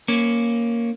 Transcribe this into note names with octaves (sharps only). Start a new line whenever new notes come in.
A#3 C#4